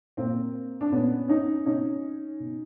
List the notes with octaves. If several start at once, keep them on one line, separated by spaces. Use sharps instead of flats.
A#2 A#3 C4
D4
A#2 B3 C#4
C#4 D#4
B2 C#4 D#4
B2